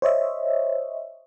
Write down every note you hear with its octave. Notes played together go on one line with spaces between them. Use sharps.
C5 C#5 D#5 E5